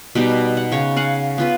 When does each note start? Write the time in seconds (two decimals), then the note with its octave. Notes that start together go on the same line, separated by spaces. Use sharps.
0.15 B2 G3 D#4
0.57 F#5
0.72 C#3 C#5
0.96 F5 F#5 G#5
1.38 B3 F4 B4